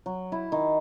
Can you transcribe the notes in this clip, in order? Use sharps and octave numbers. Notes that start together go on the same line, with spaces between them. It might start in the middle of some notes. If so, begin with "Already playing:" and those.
F#3
E4
D#3